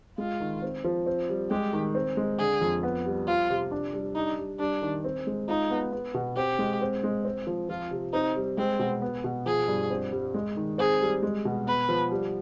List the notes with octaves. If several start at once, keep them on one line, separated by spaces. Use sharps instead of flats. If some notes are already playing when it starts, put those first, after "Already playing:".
G#3 F4
D#3
C4
F3
C4
G3
G#3 G4
D#3
C4
G#3
D3 G#4
F2
B3
G3
F3 F4
C3
D4
G3
D4 D#4
G3
G3 D4
D#3
C4
G#3
D#4 F4
B3
B3
B2
C4 G4
G#3
C4
G#3
C4
F3
F3 F4
C3
C4 D#4
G3
G#3 C4
B2
B3
B2
F3 G#4
G2
C4
G3
G#3
D#3
C4 G#4
G3
G#3
B2
B3 B4
F3
G3